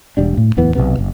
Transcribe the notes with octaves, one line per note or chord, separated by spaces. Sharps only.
E1 G3 D4
A2
D1 E2 E3 B3
B1 F#2 C3 B3
F#1